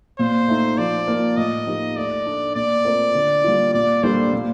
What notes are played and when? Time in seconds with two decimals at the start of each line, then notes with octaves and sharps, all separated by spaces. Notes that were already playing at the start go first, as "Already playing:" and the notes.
0.19 A#2 C5
0.48 A3 D#4
0.78 F3 D5
1.08 A#3 F4
1.37 A2 D#5
1.67 F3 A#3 D#4 G4
1.96 A3 D5
2.26 D4 A4
2.55 A#2 D5
2.85 A3 C4 F4 A#4
3.15 D3
3.44 G3 A#3 F4
3.74 A#2 D5
4.03 G3 A#3 D4 A4 C5
4.33 A#2